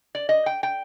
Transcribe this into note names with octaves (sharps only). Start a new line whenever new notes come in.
D5
D#5
G5
G5